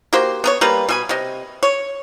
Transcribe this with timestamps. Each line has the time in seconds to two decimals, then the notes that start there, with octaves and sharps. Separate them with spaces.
0.13 A#3 F#4 G4 C5
0.44 B3 A#4 C#5
0.61 G3 A#3 B4
0.89 B2 G#5 B5
1.09 C3 D#5
1.63 C#5